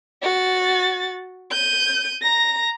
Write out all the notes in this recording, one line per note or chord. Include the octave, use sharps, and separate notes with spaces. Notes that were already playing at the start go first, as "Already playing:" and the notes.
F#4 A6
G6 D#7
A#5 A#6